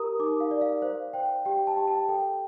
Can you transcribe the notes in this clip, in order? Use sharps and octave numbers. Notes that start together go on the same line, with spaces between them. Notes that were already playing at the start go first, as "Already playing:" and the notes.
Already playing: G4 A#4 A#5 D#6
D#4 D6
F5
D5
F5
C5 F5
C5 G5
G4 G5
A5
G4
A5
A4 G5